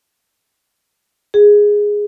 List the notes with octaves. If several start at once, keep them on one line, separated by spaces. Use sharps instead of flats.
G#4